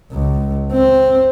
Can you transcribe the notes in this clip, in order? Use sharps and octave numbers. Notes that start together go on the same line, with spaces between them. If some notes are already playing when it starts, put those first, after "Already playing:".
C#2
C4